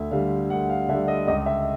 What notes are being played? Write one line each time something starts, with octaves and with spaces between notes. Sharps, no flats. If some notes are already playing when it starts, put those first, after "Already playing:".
Already playing: D2 E5
D3 G3 F5
D2 F#5
F5
D3 G3 E5
D#5
C#2 D#5
E5